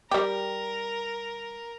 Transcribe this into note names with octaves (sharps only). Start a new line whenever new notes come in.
G3 G4 A#4